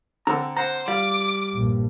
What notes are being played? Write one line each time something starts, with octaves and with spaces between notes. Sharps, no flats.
D3 C4 A#5 E6
C5 F#5 A#5
G3 F4 D6
A#1 G2